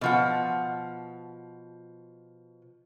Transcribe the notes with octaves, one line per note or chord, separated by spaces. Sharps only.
B2 F3 F#5